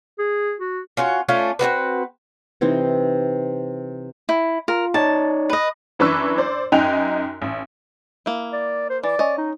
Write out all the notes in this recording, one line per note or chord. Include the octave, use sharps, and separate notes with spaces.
G#4
F#4
C#4 F4 F#4
A3 C#4 D4 F4
C4 C#4 F#4 B4
C3 E3 C4 D#4
E4
F4 A#4
D#4 C#5 D5 A5
B4 D#5
F#2 E3 D4 B4 C#6 E6
C5 D5
F#2 D#4 G5 G#5 F#6 F7
A1
A#3 E4
D5
C5
E3 D5
C#4 D#5
D#4